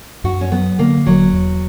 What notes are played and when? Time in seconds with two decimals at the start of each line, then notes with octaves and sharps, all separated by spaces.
0.24 F#2 F#4
0.41 C#4
0.52 F#3 B3
0.79 D3 A#3
1.06 E1 F#3
1.33 E2